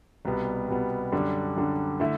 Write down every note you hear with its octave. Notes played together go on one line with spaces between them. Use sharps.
C2 B2 G3 B3
C2 B2 G3 B3
F#2 D3 G3 D4
F#2 D3 G3 D4
D3 A3 E4